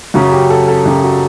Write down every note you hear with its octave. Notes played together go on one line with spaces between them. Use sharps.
F#2 C#3 F#3 C#4 F#4
G4
A4
A4
F#2 C#3 F#3 C#4 G4
F#4